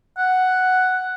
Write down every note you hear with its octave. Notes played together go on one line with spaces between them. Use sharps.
F#5